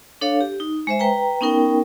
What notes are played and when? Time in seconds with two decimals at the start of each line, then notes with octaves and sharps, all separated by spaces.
0.21 D4 A4 C#5 F5
0.41 G4
0.60 D#4
0.87 G#3 C5 E5
0.99 B4 G5 A#5
1.41 B3 C#4 D#4 A#4 G5